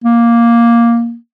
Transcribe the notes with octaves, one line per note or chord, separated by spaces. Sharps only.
A#3